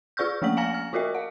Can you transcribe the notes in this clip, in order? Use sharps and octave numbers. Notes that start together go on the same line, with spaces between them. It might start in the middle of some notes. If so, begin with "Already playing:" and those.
F4 G#4 D5 C#6 F6 G6
F3 A3 A#3 B6 F#7
F5 G#5 A#5 F6 A#6
F6
F4 F#4 A#4 D#5 E5
F5 F#5